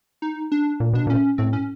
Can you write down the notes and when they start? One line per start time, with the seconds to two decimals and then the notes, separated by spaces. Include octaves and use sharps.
0.22 D#4
0.52 D4
0.80 A#2
0.93 B2 D4
1.07 A#2 C#4
1.38 A2 C4
1.53 C#4